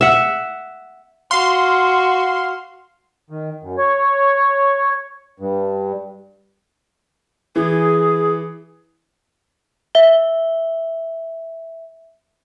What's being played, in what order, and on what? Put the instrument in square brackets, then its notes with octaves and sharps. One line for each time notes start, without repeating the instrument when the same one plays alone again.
[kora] E5 F#5
[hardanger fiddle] F#4 [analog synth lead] F5 [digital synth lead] C6
[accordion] D#3
F#2
C#5
G2
[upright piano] E3 [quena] G#4
[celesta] E5 G7